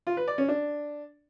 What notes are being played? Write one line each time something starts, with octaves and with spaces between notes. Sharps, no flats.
F4
B4
D5
C#4
D4